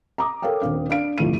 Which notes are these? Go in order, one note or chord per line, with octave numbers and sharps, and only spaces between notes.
A#5 D6 D#6
A4 A#4 C#5 F5 G5
D#1 C4 D4 F5
D4 F5 D7
G1 C2 F2 A3 D#7